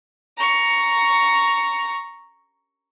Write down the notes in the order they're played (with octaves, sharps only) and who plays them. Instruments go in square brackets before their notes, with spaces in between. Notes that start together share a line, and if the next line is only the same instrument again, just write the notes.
[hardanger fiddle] A#5 C#6